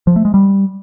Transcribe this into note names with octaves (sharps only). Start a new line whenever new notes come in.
F3
A3
G#3
G3